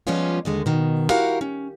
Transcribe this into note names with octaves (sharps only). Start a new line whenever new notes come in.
F3 G3 G#3 B3 C#4 F4
D#2 D3 G#3
B2 D#3
E4 F#4 G4 A#4 F5 F#5
C#4